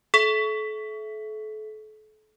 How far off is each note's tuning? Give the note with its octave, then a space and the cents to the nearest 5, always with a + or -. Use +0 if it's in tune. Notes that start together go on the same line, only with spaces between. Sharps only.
A4 -35 E5 +5